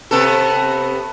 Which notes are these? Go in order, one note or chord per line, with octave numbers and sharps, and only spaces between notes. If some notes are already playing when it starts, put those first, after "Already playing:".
C3 B3 A4